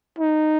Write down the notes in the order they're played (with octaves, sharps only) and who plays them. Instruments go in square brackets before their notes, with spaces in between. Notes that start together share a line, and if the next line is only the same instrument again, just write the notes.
[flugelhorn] D#4